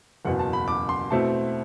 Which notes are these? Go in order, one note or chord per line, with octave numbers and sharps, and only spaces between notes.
F#1 E2 B2 F#5
A5
B5
D6
C6
B2 A3 C4 E4 A5